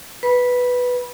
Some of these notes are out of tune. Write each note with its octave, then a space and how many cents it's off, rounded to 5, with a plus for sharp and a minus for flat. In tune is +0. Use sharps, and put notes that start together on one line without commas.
B4 +0 B5 -20